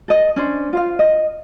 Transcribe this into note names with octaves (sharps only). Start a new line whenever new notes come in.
A4 D#5
C#4 D4 C5
F4 C5 F5
D#5